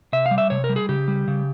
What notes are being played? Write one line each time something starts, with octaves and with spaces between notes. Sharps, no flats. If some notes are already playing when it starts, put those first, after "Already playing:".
C3 E5
F5
G3
E5
C3 C#5
A#4
G3
G#4
C#3 G4
G3
C#3